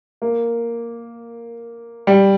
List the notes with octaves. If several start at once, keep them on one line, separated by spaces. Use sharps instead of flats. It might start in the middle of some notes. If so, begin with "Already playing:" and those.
A#3
G3